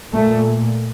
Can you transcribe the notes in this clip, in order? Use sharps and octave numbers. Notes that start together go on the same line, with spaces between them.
A#2 A3